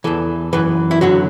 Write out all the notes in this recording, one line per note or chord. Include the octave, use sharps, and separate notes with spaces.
E2 E3 A4
F#2 E3 B4
E4
F#2 D3 F#3 F#4